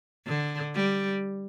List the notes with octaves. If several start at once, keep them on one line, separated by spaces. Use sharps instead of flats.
D3
G3